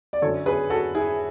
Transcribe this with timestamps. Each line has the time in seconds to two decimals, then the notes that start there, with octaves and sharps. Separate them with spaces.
0.13 D5
0.22 F#2 D3 F#3 A4 C#5
0.46 G#4 B4
0.70 F#4 A4
0.94 E4 G#4